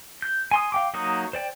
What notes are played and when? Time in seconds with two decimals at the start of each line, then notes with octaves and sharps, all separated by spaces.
0.22 G6
0.51 G#5 C6 D#6
0.72 F5 G5 D6
0.94 F#3 A#3 D#4 F#4 D#6
1.33 C5 D5 G5